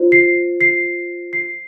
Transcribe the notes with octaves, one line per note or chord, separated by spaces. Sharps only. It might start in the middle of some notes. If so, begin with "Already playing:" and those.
Already playing: F4 C5
C7
C7
C7